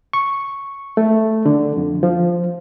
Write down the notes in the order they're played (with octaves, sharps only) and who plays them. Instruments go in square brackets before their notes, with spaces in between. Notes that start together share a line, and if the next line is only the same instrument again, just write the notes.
[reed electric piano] C#6
A3
D3
F2
F3